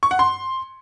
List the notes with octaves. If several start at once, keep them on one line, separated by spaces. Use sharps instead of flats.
C#6
F#5
C6